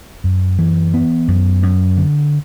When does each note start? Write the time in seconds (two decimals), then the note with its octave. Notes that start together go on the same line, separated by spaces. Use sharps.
0.24 F#2
0.59 E3
0.94 B3
1.28 F#2
1.63 F#2
1.97 D3